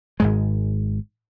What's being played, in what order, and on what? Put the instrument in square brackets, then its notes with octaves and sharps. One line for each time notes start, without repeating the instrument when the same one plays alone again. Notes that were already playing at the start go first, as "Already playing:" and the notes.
[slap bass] G#1 G#2 G#3